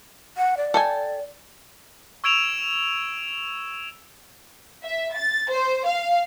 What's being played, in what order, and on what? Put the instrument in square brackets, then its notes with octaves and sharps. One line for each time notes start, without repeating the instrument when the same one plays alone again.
[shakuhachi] F#5
D5
[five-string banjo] A4 G5 G#5
[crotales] C#6 E6 G#6 D7 E7 F7
[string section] E5
A6
C5
F5